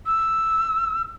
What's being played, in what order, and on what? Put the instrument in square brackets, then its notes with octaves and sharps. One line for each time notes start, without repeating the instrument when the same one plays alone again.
[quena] E6